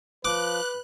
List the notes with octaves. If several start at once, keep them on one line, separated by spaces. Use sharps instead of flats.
F3 B4 D6 F#6